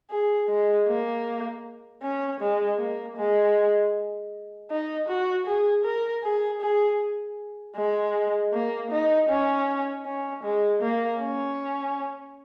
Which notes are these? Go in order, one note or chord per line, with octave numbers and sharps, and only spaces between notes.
G#4
G#3
A#3
C#4
G#3
A#3
G#3
D#4
F#4
G#4
A#4
G#4
G#4
G#3
A#3
D#4
C#4
C#4
G#3
A#3
C#4